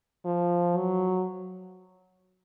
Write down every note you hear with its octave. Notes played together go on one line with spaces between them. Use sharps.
F3
F#3